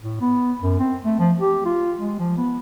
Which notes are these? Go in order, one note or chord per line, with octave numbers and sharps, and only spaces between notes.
A2
B3
F#2
C4
A3
F3
G4
F4
G#3
F3
B3